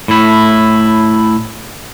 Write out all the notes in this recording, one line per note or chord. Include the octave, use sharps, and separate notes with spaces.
A2 E4